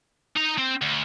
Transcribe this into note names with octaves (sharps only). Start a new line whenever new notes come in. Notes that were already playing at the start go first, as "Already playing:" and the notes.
D#4 A#5
C4
D2